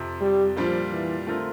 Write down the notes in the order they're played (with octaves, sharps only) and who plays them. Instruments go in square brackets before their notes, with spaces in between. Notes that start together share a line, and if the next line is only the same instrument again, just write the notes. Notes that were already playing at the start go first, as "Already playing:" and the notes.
Already playing: [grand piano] F2 C3 F3
[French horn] G3
[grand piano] A#2 G3 D4 F4 [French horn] F3
[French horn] E3
[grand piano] D3 A3 C4 F4 A#4